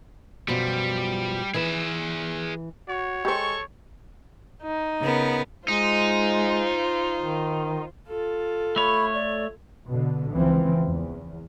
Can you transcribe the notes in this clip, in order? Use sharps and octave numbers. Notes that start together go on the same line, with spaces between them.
F#2 B2 F3 G3
E3 G#4 B4 E5
F#4 C#5
G#3 G4 A4 C5 C#6
D#4
C#3 B3 A#4
G#3 D#4 F4 C5
D#3
F4 A4
A3 C#5 B5
D5
B2 D3
C#2 E3 F3 C4
E2